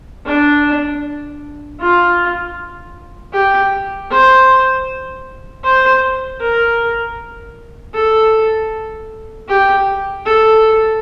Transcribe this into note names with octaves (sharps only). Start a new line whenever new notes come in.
D4
F4
G4
C5
C5
A#4
A4
G4
A4